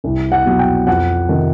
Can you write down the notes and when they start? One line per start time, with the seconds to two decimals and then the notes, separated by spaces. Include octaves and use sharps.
0.04 C2
0.32 F#5
0.45 B2 F#3 B3
0.59 G5
0.87 F2 F#5
1.29 C3 D#3